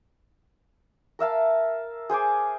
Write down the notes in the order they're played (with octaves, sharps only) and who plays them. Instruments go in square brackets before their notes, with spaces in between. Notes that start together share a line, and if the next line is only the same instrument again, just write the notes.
[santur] A#4 E5 F5 A5
G#4 C5 G#5 D6